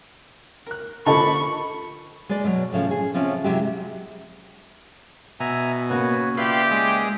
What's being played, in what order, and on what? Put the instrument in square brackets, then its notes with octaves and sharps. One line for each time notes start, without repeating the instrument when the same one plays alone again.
[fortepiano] A#4 F#6
[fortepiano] D3 F3 A#3 [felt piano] A4 D#5 A5 [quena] B5 [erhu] C#6
[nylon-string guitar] G#3 D5
B2 F#3
A2 C#3 F3
G#4
C3 F3 C4 C#4
C3 F#3 G#3 E4 G4
[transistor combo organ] B2 [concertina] E5 G#5 A#5
[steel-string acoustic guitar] C#3 A#3 G#5 [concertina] F#4 B4 C#5
[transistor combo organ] F4 B4 C6 [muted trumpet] G4 [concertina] D5 E5 G5
[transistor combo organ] G#3